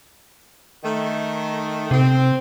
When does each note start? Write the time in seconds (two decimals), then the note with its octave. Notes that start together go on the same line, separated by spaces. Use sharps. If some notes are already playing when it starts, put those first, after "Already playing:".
0.83 D#3 A3
1.91 C3 C4